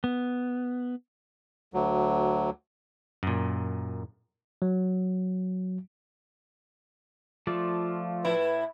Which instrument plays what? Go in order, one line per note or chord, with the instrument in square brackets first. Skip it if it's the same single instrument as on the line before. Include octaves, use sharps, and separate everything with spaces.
[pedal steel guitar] B3
[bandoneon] D2 F#3
[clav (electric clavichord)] F#2 A#2
[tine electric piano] F#3
[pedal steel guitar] F3 A3 D5 [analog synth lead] F4
[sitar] A2 E4 [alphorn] B4